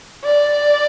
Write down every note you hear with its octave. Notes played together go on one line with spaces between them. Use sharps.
D5